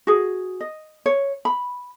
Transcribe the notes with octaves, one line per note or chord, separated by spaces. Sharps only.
F#4 G#4
D#5
C#5
B5